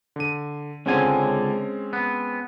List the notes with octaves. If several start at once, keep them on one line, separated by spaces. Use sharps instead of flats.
D3 D#7
C#2 D3 G#3 C4 C#4 G#5
B3